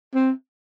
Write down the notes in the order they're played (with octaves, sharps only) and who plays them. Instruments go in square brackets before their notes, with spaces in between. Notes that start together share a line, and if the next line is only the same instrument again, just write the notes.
[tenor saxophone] C4